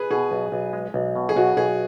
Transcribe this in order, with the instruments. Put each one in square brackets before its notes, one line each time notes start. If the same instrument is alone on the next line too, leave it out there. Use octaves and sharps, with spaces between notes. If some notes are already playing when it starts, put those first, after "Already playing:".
Already playing: [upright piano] G#4 B4
[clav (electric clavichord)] B2 [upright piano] G#4
[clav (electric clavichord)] B1
B1
G#3
B1
B2
[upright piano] G#4
[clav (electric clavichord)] B1 [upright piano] F#4
[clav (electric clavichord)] B1 [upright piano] G#4